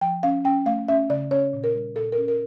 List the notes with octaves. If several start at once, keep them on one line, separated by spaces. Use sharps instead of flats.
F3 G5
C#4 F5
C#4 G5
A3 F5
C#4 E5
C#3 D5
C#4 C#5
A#2
A#4
G3
A#2 A4
C#4 A#4
A#4